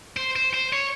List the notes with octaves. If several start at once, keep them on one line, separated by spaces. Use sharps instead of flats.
C5
C5
C5
C#5